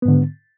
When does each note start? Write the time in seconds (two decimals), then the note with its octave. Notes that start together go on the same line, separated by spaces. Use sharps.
0.02 B3
0.05 G#2
0.08 D3